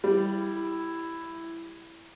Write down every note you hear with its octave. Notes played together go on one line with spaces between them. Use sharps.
G3 E4